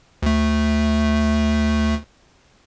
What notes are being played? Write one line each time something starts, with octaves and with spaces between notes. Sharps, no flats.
D2 A3